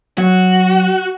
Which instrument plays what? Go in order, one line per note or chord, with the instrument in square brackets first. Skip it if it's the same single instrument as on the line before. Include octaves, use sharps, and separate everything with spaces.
[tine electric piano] F#3 [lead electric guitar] F#4